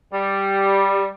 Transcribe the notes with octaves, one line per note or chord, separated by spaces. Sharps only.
G3